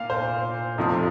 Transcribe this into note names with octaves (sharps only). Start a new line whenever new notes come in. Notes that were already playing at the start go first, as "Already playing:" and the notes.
Already playing: A#2 F5
C5
F1 F2 C3 F3